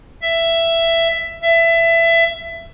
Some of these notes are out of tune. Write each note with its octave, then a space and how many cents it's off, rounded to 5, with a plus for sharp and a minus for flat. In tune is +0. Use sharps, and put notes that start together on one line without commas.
E5 +10
E5 +20